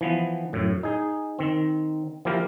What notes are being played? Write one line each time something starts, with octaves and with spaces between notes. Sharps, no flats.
E3 F3 B3
F#2 A2
D#4 G#4
D#3 C4
F3 A#3 E4 G4 A#4